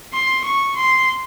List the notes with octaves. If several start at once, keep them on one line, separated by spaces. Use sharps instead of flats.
C6
C#6
C6